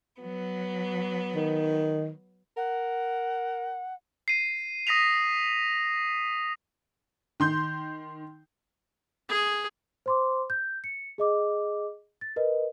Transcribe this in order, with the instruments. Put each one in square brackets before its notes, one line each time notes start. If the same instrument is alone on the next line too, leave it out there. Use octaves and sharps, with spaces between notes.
[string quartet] F#3 B3
[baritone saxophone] D#3
[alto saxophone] A#4 [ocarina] F#5
[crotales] C7 D#7
D#6 A#6 B6 D#7 F7
[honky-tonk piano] D#3 C6 G6
[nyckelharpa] G#4
[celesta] C5 C6 D6
G6
C#7
G#4 D#5 D6
A6
A#4 B4 D#5